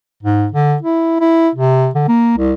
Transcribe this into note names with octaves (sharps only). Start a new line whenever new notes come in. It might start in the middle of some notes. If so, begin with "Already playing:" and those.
G#2
D3
E4
E4
C3
D3
A#3
C2